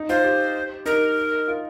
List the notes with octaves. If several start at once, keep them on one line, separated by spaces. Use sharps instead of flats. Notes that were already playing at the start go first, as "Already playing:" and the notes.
Already playing: D#4
F4 C5
G4
D#4 A#4
F4